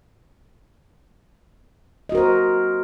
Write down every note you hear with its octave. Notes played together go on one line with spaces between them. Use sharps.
F#4 A#4 C5 D#5